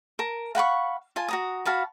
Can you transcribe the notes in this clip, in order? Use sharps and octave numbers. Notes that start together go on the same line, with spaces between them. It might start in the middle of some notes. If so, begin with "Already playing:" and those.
A#4 A5
F5 F#5 B5 C#6
F4 G#5 A5
F#4 A#5 D#6
F#4 F5 A5 B5